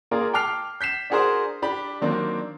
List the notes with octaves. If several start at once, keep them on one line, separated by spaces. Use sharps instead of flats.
A#3 F4 G#4 A#4 D5
G5 A5 D6 F6 C7 F7
G6 B6 C7 E7
D4 F#4 G#4 A#4 C5 D5
D4 G4 B5
D#3 F#3 A#3 C4 D4